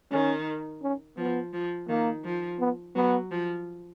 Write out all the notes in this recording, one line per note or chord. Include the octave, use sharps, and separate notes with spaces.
D#3 C#4
C#4
F3 B3
F3
D#3 A#3
F3
B3
F#3 B3
F3